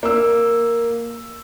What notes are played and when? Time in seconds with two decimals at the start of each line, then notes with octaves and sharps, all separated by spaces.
0.03 A#3 E6